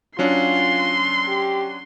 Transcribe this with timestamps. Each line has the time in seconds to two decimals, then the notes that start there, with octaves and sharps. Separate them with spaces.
0.19 F#3 C#4 D4 F4 C6
1.28 G4